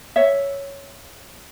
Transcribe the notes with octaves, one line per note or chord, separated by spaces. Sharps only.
C#5 E5